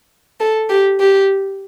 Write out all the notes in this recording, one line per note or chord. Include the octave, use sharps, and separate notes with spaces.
A4
G4
G4